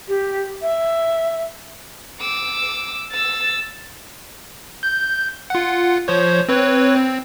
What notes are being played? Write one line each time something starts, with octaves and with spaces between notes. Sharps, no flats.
G4
E5
D6 E6
E6 A6
G6
F4 F#5
F3 C5 C#5
C4 B4 C#5
C4